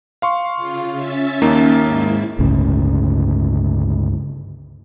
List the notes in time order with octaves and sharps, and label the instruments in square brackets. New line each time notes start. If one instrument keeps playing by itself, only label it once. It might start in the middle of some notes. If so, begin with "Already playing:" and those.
[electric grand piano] F5 C6 C#6
[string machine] C#3 F4
C#4 E5 A6
[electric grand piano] D#2 A#3 D#4
[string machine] G#2 E4
[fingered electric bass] G1 C#2 A2 C#3